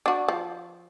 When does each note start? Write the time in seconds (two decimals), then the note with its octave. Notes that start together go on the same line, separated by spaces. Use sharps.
0.06 D4 F#4
0.28 F3